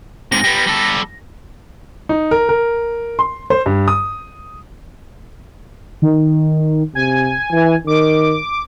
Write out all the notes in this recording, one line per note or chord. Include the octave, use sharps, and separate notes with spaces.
G#2 C3 A#6
G3 B3
G3 A4
D#4
A#4
A#4
C6
C5
G2
D#6
D#3
C3 G#5
E3
D#3 D6